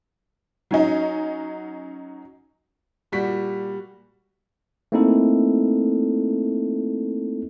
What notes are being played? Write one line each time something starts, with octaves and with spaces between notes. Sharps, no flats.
F#3 C#4 D#4
A#2 G3 F#4 B6
A3 A#3 C4 D#4 E4 A4